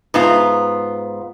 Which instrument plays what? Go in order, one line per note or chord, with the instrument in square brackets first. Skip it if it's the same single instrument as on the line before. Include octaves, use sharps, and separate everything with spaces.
[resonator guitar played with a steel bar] G#2 B3 F4 A#5